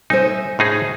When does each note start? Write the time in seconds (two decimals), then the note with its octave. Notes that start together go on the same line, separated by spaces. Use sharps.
0.10 D#4 C5 E5 G#5
0.59 A2 D#4 G#4